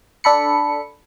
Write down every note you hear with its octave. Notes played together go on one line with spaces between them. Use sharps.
D4 A4 B5 C#7